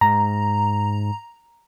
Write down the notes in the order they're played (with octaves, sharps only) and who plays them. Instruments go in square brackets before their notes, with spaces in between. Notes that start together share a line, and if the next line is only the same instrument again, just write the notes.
[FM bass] G#2 [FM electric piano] A#5